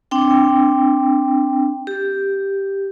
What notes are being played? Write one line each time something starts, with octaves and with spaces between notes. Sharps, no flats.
C4 D4 G5
G4